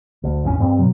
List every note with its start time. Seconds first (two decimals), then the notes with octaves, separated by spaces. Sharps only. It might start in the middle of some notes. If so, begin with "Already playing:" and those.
0.24 D2
0.44 G#1 E2 D#3 C#4
0.60 G2 C4
0.78 B2 F#3